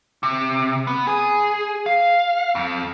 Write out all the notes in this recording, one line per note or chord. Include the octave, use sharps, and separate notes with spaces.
C3
B3
G#4
F5
F2